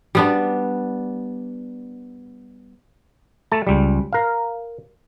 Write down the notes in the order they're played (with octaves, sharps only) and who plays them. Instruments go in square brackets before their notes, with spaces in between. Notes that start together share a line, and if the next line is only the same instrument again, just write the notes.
[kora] G3 B3 D4
[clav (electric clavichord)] A3 A5
C#2 G3
A#4 F5